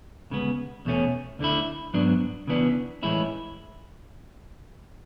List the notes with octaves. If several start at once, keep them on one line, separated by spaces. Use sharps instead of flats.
D2 C#3 G#3 B3
E2 B2 A3 C#4
D2 D3 A3 E4
G#2 F#3 B3 D4
C#3 E3 B3 D4
A2 E3 G#3 C#4 E4